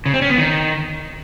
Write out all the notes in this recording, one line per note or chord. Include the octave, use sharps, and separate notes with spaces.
C#3
C4
C#4
B3
D#3